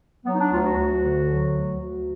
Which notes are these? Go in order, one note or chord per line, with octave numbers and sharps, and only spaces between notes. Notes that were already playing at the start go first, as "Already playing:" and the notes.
F#3 B3
D#4
D4
D2 F4
F#4
D2
D3
F#3
D2
D2